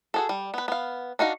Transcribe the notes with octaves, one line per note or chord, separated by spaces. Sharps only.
F#4 G#4 A4
G3
B3 B4
B3 F5
D4 D#4 F#4 F5